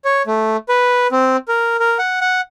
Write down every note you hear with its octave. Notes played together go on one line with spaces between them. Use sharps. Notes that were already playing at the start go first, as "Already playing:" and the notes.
C#5
A3
B4
C4
A#4
A#4
F#5
F#5